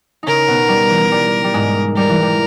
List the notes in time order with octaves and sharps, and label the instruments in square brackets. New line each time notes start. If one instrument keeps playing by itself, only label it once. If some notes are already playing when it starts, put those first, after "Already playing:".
[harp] C#3 C#4 D#4 [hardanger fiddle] A#4
[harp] B2 B3
G3
E3
G3
G3
G#2 G#3
[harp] G3 [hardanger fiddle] A#4
[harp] E3
G3